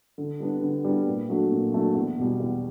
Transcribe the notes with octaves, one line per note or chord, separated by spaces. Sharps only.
D3
G3 B3 D4
D3
G3 B3 D4
A#2
F#3 A3 D4
A#2
F#3 A3 D4
E2
B2 G3
E2